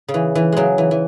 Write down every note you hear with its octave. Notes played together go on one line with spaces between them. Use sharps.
C#3
E3
E3
C#3 F#3 G#3
E3
E3